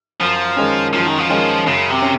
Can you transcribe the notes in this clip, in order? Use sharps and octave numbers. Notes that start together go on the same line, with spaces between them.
F#2 F3
D#3 G#3 C#4
F#2 F3
D#3
F3
D#3 G#3 C#4
F#2 C#3
C3
C#4